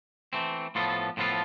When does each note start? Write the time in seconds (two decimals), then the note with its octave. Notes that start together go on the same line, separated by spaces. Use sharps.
0.33 E3 A3 C4
0.75 A2 F3 B3 F4 A4
1.17 A2 F3 B3 F4 A4